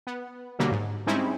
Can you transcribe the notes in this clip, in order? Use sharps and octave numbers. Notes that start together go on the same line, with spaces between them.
B3
B2 D3 F#3 G3 A#3
G#2
G3 G#3 C4 C#4 D#4 E4